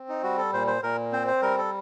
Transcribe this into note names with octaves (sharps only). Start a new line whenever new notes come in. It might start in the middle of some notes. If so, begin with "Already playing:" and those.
Already playing: C4
D#4
G3 F#4
A4
A#2 C5
C5
A#2 A#4
C4 C5
C5
G3 A#4
A4